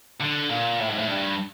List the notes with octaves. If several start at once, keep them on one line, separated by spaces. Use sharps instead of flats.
D3
A#2
A2
G#2
A2
G2